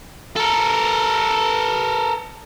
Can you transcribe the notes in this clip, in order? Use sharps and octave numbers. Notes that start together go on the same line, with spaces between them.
A4 A#4